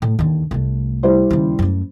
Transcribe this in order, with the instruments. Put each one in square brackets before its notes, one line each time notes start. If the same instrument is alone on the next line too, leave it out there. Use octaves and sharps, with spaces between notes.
[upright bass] A2 A3
D#2 D3
C2 A3
[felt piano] G3 E4 C5
[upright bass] D#2 C#3
F#2 A3